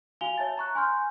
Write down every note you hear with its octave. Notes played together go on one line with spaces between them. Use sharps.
F#4 F5 G#5 F7 G7
C#5 E5 A5 A6
A#5 C#6 F#6
G#5 C6 F6 G6